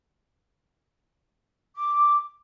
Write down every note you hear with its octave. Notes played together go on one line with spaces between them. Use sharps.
D6